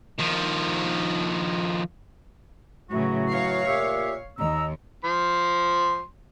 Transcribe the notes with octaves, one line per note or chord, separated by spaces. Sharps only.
D#3 F3
A2 C#3 E3 F#3 F#4
C#5 F5
A#2 G4 E5
D#2 D#5 A#5 E6
F3 C6